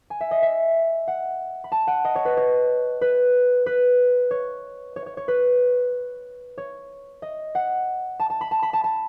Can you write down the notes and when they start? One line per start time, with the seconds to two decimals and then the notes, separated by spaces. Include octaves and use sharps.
0.10 G#5
0.21 E5
0.31 D#5
0.42 E5
1.08 F#5
1.64 B5
1.72 A5
1.87 F#5
2.05 D#5
2.16 C#5
2.25 B4
2.37 C#5
3.01 B4
3.66 B4
4.31 C#5
4.96 C#5
5.06 C#5
5.17 C#5
5.28 B4
6.58 C#5
7.22 D#5
7.55 F#5
8.20 A5
8.30 A5
8.41 B5
8.51 A5
8.63 B5
8.73 A5
8.84 A5